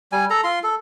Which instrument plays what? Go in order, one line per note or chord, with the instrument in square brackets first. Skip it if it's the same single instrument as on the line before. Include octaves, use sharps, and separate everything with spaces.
[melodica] G3 G#5
A4 A#5
F4 C6
A4